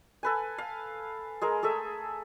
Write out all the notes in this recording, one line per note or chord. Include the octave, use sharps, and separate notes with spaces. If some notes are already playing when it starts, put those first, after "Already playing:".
A4 B4 G#5
F5
G#3 G#4 A#4
A3 G#4 A4 E5